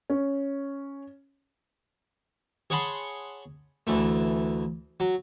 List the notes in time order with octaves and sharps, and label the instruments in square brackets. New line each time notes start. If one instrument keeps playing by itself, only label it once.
[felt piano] C#4
[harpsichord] G#4 C#5 F#5 A5 B5 C6
D2 E3 A3
F#3